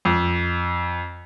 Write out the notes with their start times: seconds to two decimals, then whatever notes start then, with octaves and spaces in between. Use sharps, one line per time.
0.05 F2